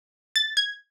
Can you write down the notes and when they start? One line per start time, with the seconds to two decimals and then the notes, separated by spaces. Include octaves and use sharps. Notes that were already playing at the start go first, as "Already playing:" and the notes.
0.36 A6
0.57 G#6